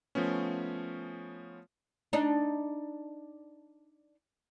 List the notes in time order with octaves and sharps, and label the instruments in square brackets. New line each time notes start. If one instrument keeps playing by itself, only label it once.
[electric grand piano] F3 A3 B3 C#4
[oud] D4 D#4